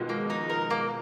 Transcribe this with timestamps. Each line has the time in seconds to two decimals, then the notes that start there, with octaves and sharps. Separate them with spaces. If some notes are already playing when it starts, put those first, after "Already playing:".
Already playing: B2 D#3 F3 G#3
0.09 A#3
0.30 D#4
0.50 A#4
0.70 A#3